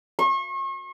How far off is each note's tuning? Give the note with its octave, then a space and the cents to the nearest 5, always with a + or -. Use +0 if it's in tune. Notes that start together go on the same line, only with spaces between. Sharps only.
C#6 -40